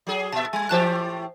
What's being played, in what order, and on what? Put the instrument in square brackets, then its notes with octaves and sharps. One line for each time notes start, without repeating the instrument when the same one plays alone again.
[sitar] F#3 G#4
[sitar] A#2 E5 [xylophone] A5
[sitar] G3 [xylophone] G#5 G#6
[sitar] A2 E3 G4 [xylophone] C5 A5 F#6